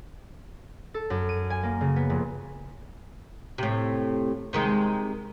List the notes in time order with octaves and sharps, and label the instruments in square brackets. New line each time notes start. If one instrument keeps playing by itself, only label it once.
[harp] A4
F#2
D#7
G#5
A#3
C#3
B3
F1
[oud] A2 C3
C3 D#3 G#3